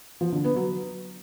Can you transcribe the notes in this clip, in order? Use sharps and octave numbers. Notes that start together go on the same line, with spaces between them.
F3
D3
B3
F#3